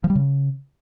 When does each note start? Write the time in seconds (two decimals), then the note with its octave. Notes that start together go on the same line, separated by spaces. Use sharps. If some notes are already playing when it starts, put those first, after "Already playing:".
0.04 F3
0.10 G3
0.15 C#3